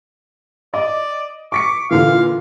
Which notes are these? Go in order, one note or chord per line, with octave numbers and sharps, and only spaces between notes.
D5 D#5
C#6 D6 B6 C#7
A#2 D3 E3 F5